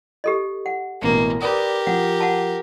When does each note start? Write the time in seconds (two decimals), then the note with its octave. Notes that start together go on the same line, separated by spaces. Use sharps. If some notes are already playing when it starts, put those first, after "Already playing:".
0.24 G4 A4 D#5
0.66 F#5
1.02 A1 B2 E3 A#3
1.42 G4 A#4 B4 D5 D#6
1.87 F3 F#5
2.20 F#5 A5